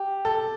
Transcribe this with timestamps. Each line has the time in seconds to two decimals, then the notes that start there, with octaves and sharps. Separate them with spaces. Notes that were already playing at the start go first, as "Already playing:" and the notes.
Already playing: G4
0.25 A4